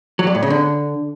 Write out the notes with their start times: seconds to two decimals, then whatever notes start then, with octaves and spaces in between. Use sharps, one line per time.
0.19 F#3
0.27 G2
0.35 A2
0.43 C#3
0.50 D3